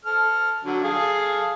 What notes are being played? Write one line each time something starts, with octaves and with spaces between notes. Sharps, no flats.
A4 F6
D3 F#3
G#4 A4 F5